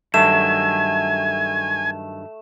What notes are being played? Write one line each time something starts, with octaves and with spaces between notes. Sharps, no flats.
G2 D#3 F#3 A3 G#5 E7